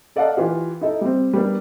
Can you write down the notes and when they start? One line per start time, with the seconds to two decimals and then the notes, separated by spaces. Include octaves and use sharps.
0.16 A4 D5 D#5 F5 F#5 A5
0.37 E3 F4 G4
0.81 D#4 E4 A4
1.01 G3 C4
1.33 G3 A#3 B3 D4